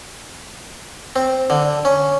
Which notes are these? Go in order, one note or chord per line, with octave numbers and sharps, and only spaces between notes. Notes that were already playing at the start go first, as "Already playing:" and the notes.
C4
D3
C#4